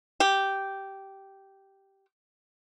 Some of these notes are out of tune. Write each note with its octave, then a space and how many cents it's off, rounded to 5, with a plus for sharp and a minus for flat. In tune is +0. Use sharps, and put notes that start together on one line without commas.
G4 -10